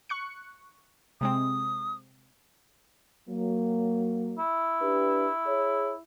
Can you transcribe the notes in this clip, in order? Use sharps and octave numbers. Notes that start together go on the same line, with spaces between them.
C#6 F#6 C#7
C3 G#3 C4 D#6
F#3 A#3
E4
D4 G4 B4
G#4 C#5